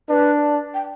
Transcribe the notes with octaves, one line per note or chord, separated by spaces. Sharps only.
D4 B4
G5